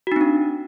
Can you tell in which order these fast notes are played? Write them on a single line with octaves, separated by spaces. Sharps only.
F#4 D#4 C4 D4